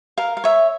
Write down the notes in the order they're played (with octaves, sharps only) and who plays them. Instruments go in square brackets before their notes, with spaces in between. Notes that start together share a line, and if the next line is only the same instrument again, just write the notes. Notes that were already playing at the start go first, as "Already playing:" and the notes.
[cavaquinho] A#4 F5
F5
C#5 E5